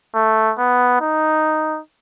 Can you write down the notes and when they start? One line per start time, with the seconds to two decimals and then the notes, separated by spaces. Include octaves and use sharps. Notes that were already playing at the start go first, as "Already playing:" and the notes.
0.15 A3
0.59 B3
1.01 D#4